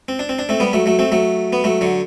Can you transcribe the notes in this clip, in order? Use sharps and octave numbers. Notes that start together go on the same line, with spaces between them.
C4
D4
C4
D4
A3 C4
G3 B3
F#3 A3
F#3 A3
A3 C4
F#3 A3
B3
F#3 A3
D3 F#3